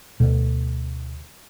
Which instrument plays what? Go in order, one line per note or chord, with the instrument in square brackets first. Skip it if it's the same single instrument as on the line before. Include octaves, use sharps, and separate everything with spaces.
[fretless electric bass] D2 B2 D3